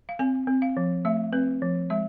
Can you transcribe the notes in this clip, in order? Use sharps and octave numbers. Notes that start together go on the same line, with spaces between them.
F5
C4 G#5
C4
F5
F3
A3 E5
C4 B4
F3
G#3 E5